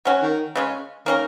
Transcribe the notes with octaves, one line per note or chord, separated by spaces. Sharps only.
F#3 C#4 F#4
D#3
C#3 G#3 C#4
D#3 A#3 C#4 A#4